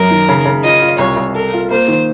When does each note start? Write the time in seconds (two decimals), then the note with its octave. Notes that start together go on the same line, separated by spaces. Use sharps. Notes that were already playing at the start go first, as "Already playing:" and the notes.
Already playing: F#2 A#4
0.10 D#3
0.29 C#3
0.45 C#3
0.64 F4 D#5
0.82 F4
0.99 C2 C#5
1.16 C2
1.35 A4 A#4
1.53 F4
1.71 A#3 C5
1.88 D#3